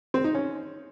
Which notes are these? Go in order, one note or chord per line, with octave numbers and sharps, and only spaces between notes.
C4
D#4
C#4